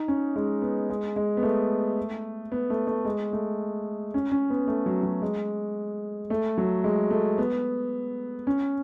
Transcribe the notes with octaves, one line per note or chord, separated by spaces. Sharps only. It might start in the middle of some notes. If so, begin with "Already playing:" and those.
Already playing: D#4
C#4
G#3
B3
G#3
G#3
B3
A3
B3
A3
A3
G#3
A3
C#4
C#4
B3
A3
F#3
F#3
G#3
A3
F#3
G#3
A3
B3
C#4